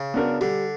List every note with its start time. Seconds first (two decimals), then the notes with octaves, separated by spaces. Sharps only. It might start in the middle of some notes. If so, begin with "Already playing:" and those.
Already playing: C#3
0.14 B3 D4 F#4 A#4
0.41 D3 G3